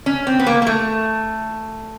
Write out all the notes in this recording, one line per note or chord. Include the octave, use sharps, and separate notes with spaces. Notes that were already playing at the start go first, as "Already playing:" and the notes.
C#4
C4
B3
A#3
A#3
A3